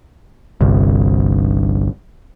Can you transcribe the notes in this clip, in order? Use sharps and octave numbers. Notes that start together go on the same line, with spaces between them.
G1 C2